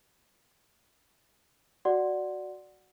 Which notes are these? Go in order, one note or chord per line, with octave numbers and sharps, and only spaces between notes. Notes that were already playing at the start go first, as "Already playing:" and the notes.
F#4 D5 F#5 C6